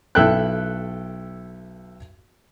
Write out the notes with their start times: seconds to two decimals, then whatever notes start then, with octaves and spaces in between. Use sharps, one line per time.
0.15 B1 E4 A4 E5 G5 F#6